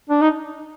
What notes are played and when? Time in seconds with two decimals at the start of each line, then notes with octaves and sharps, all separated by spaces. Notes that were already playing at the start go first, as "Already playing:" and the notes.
0.09 D4
0.21 D#4